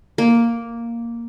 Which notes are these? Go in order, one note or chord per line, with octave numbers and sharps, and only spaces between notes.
A#3